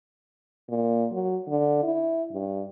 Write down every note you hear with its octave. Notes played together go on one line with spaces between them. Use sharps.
A#2
F#3
D3
E4
G2